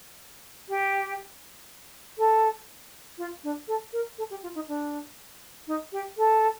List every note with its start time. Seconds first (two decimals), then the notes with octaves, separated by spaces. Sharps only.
0.69 G4
2.18 A4
3.18 F4
3.44 D4
3.68 A4
3.93 A#4
4.18 A4
4.30 G4
4.43 F4
4.55 D#4
4.68 D4
5.67 D#4
5.92 G4
6.17 A4